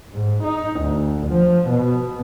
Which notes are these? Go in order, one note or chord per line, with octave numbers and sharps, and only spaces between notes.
G#2
D#4
D2
F3
B2